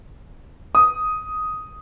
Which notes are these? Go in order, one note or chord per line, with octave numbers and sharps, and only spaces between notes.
D#6